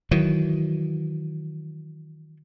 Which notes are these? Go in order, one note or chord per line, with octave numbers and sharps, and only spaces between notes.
D#3 E3 F#3